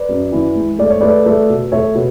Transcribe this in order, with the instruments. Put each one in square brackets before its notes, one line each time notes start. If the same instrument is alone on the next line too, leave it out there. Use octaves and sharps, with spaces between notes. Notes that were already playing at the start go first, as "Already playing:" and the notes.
Already playing: [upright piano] B4 D5
F#2
E3
G#3
A3 D5
C#5
A3 B4 D5
A3
B2
A3 C#5 E5
B2